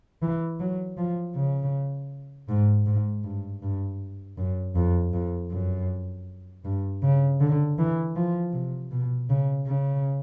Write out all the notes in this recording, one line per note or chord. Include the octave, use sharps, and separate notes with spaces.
E3
F#3
F3
C#3
G#2
G#2
G2
G2
F#2
F2
F2
F#2
G2
C#3
D3
E3
F3
C3
B2
C#3
C#3